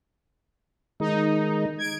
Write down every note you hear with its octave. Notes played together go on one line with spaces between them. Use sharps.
D#3 G#3 D#4
G#6 D7